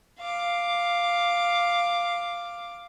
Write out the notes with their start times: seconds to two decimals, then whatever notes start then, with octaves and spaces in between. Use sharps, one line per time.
0.19 F5 D6